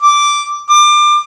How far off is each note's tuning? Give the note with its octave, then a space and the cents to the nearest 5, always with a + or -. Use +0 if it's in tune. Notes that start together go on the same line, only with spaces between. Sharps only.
D6 -5
D6 +25